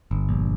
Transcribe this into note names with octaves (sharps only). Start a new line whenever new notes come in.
G1
A#1